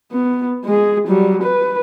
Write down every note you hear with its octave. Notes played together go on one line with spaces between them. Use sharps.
B3
G#3 G#4
F#3 G3
B4